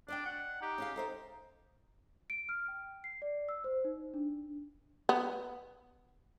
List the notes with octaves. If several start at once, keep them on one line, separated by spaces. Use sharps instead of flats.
D4 D5 D#5 G5
F#5
D#4 G4
C#4 G#4 F5
D#4 A4 C5 E5
D7
F6
G5
C7
D5
E6
C5
D#4
D4
B3